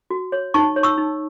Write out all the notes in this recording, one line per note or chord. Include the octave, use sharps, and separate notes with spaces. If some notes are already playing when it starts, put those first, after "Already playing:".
F#4
C#5
D#4 A5 C#6
C#5
C#6 E6
D#4